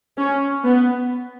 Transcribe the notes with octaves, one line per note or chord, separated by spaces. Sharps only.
C#4
B3